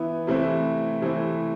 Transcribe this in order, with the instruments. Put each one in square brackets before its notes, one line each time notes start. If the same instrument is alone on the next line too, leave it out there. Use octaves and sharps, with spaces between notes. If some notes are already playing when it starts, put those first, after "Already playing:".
Already playing: [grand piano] E3 B3 E4
C3 E3 A3 C4 E4
C3 E3 A3 C4 E4